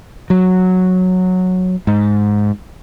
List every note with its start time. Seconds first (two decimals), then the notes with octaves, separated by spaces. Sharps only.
0.30 F#3
1.87 G#2